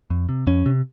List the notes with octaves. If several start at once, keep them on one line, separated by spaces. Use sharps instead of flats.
F2
C3
F2 C#4
C3